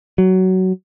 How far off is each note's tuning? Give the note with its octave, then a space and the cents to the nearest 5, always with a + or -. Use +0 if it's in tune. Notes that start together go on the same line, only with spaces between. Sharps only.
F#3 +15